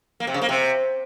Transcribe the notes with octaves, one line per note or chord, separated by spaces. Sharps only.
A#3
C3
C#3
A#3
C3